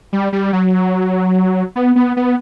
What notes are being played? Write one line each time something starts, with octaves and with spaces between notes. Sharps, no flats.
G3
G3
F#3
B3
B3
B3